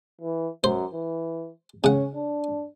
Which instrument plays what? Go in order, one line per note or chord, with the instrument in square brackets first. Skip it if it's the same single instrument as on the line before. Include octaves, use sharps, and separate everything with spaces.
[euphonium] E3
[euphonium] F#2 [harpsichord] C5
[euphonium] E3
[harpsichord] C#3 F#5 [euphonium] C#4
[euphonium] D4